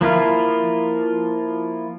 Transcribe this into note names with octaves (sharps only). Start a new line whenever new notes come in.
F3 A#3 E4 F4